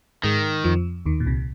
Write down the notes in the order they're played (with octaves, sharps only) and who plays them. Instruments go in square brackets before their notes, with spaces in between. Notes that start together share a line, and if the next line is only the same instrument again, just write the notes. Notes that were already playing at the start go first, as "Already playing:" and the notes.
[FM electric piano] G#2 G#3 [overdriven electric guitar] D#3
[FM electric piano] F2 F3
D#2 D#3
A#2
C2 C3